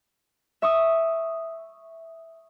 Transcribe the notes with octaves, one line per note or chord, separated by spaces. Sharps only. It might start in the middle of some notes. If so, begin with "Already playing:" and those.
E5 C#6 D#6